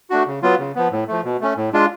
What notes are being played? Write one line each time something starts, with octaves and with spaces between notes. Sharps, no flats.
A3 D4 F#4
C#3
F#3 B3 F4
C#3
F3 B3
A2
F3 A3
B2
A3 C#4
A2
G#3 D4 F4